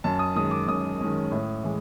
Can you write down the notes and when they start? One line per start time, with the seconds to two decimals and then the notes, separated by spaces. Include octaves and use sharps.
0.04 F#2 A5
0.19 D#6
0.35 D#3 G#3 C#4 D#6
0.51 D6
0.68 F#2 D#6
1.01 D#3 G#3 C#4
1.32 A2
1.63 E3 G#3